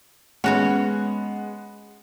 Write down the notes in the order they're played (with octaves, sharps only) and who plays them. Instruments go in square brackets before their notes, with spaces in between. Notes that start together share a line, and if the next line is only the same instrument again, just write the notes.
[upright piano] G#3 B3 [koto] C#4 F#4 C#5 [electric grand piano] F#5